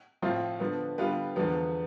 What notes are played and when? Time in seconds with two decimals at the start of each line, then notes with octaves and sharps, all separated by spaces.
0.22 A2 F3 C4 F4
0.60 D3 F3 B3
0.98 D3 G3 B3 F4 B4
1.36 E2 D3 F3 B3